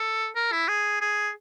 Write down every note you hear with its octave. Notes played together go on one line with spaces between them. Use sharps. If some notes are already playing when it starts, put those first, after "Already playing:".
Already playing: A4
A#4
E4
G#4
G#4